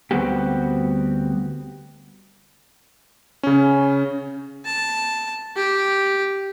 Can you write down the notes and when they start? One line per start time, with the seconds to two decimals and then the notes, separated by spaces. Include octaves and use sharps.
0.11 D2 G3 B3 C4 F#4 G4
3.43 C#3 C#4
4.66 A5
5.56 G4